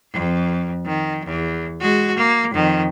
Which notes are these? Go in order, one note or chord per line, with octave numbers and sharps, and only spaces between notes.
F2
D#3
E2
G#3 F#4
A#3
F2 D#3